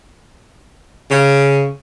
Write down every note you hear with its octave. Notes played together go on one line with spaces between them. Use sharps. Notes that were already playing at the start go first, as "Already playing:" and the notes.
C#3